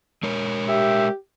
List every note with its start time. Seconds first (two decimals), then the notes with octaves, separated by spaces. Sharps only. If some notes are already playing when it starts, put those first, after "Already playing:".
0.23 G#3 A#4 C#5
0.69 G4 E5